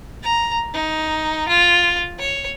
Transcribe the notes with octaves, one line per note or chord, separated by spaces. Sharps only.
A#5
D#4
F4
C#5